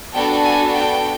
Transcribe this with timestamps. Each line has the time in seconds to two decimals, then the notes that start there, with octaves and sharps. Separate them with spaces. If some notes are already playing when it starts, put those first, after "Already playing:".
0.15 B3 D4 F#4 A4 G5
0.45 G#5
0.74 G5